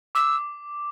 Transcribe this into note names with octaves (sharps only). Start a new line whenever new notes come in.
D6 E6